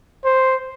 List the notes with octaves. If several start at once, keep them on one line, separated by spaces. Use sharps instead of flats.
C5